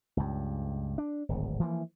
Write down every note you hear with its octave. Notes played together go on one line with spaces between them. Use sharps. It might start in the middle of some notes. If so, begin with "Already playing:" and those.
C#2 G2
D4
D1 G#1
E3 F3 A#3